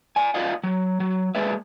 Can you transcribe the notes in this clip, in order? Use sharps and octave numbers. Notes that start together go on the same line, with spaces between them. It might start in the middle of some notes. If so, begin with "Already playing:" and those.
D5 G#5
F4 D5 D#5 F5 F#5
F#3
F#3
G#3 A#3 G#4 B4 D5 E5